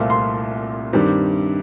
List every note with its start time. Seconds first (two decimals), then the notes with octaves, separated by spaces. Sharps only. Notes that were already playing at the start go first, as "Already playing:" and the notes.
Already playing: C2 A#2 A3 C4 F4
0.10 C6
0.93 G2 D#3 G3 C4